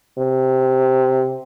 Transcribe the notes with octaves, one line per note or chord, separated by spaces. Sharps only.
C3